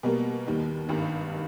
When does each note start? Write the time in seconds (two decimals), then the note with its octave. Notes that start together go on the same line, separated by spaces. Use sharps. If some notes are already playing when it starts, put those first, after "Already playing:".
0.03 B2 G3 A#3
0.46 D#2 D#3 G3
0.89 G#1 G2 D#3 G3